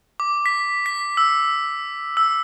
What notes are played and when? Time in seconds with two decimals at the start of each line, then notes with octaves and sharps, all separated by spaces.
0.20 D6
0.46 B6
0.86 B6
1.17 E6
2.17 E6